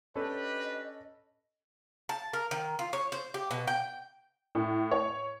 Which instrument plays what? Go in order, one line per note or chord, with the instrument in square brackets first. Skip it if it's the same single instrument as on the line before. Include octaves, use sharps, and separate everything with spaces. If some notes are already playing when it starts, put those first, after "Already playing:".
[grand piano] C#4 A4 [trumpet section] D4 G4 B4 [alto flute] D#5
[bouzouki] A5
A#4
D#3
F4
C#5
C5
G4
B2
G5
[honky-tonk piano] A2
C#5